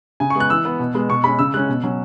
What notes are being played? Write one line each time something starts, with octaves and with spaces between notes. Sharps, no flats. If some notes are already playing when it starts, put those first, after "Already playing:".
C#3 G#5
C#6
G#3 B3 F#6
E3 E6
B3
B2
G#3 B3
B2 C#6
G#3 C#4 B5
C#3 E6
G#3 C#4 F#6
B2
F#3 C#4